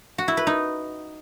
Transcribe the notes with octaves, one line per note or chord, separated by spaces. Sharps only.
F#4
E4
B4
D#4